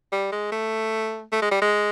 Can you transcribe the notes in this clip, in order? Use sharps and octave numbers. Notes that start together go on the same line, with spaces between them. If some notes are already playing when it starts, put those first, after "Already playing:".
G3
G#3
A3
A3
G#3
G3
G#3